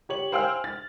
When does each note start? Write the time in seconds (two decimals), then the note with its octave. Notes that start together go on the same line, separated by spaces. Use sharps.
0.09 G4 C#5 F#7
0.32 C5 F5 G5 G#5 E6 F6
0.64 A6